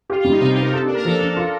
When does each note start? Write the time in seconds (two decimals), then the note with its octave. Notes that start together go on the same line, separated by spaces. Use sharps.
0.09 F4 G4
0.20 F4
0.25 G3
0.31 D#4
0.41 C3 D#4
0.51 G4
0.57 C4
0.62 A#4
0.73 G4 A4
0.84 D4
0.88 A#3
0.94 A#4
1.05 F3 A4
1.21 D4
1.37 F4